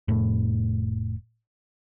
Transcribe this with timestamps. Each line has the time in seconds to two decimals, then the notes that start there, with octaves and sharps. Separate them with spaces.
0.08 F1 A2